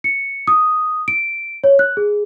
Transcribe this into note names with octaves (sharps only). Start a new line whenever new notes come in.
C#7
D#6
D7
C#5
F#6
G#4